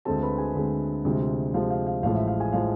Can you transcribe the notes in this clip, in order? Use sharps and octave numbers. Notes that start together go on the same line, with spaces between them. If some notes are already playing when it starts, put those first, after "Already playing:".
D2 D3 G#3 C4 A4 A5
B4 B5
G#4 G#5
D2 D3 G#3 C4
D2 C3 F3 G#3
D2 C3 F3 G#3 F5
F5
F5
A1 A2 F3 G#3 F5
E5
F5
G#4 G#5
A2 F3 G#3 F5